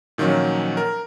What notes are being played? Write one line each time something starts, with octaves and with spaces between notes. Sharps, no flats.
A#2 D#3 F3 F#3 C#4
A#4